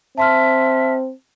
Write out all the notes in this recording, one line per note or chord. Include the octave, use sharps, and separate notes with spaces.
C4 E5 A5 C6 F6